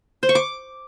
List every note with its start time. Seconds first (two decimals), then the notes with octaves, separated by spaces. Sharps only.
0.23 C5
0.29 C#6
0.35 D6